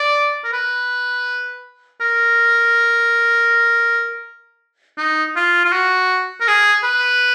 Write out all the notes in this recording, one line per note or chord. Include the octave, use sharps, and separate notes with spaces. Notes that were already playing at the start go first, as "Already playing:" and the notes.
Already playing: D5
A#4
B4
A#4
D#4
F4
F4
F#4
A#4
G#4
B4